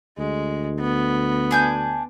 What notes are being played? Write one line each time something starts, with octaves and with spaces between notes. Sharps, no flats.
D2 G#3
B3
D4 G#5 G6